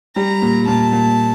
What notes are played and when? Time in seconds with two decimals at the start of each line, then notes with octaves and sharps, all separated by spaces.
0.16 G3 A#5
0.42 A#2
0.67 A#2 A5
0.93 A#2